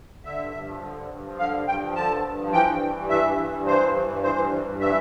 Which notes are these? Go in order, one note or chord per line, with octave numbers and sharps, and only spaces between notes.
D3 E5
G2
G2
F3
D3
G2
G2
F3
D3 F5
G2
G2 G5
F3
D3 A5
G2
G2
F3
E3 G5
G2
E3
G2
E3 E5
G2
E3
G2
E3 C5
G2
E3
G2
E3 C5
G2
E3
G2
E3 E5